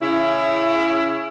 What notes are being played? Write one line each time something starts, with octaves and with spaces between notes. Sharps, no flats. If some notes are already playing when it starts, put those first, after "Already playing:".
C#3 E4